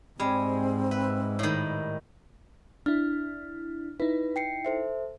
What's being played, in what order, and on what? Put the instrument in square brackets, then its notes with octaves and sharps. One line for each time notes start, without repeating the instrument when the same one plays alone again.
[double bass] G#2 [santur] G3 [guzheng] G#3 [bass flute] C4
[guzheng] B4 [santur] E5
[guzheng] A2 D#3
[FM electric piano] D4 E4 [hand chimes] F6
[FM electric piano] D#4 E4 [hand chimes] B4
[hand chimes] G5 C7 C#7
A4 C5 E5